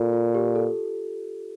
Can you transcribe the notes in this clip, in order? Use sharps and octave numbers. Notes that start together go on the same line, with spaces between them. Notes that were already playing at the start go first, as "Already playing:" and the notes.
Already playing: A#2 F4 A4
F4
G4
A4